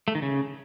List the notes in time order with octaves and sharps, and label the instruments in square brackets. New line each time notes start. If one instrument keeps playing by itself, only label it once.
[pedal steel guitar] A3
D#3
C#3